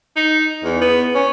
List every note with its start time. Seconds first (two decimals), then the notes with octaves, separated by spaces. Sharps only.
0.16 D#4
0.64 E2
0.81 B3
1.14 C#4